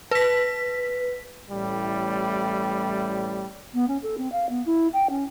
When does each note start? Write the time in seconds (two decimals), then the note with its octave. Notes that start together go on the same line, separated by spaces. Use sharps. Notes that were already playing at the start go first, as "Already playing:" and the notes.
0.11 B4 B6
1.51 A1 A2 G3
3.74 B3
3.88 C#4
4.03 A4
4.18 C4
4.32 F5
4.49 B3
4.66 E4
4.93 G5
5.10 C#4